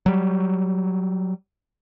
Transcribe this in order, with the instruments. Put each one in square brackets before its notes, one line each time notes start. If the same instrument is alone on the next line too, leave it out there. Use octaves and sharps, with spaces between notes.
[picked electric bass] F#3 G3